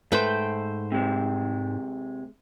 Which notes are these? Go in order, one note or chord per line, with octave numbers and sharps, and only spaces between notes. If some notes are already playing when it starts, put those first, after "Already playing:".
G#2 A3 B4 C5 G5
C3 G#3